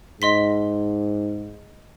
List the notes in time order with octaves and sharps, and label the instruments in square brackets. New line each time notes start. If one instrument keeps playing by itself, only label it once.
[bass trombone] G#2 [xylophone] D#5 C6 B6